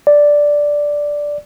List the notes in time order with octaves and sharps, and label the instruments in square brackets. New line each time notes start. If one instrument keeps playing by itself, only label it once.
[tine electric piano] D5